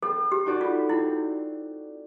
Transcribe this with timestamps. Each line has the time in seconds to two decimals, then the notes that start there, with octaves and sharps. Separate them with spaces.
0.02 C4 A4
0.32 G4
0.46 D#4 F#4 A4 D5
0.61 F4
0.89 C4 E4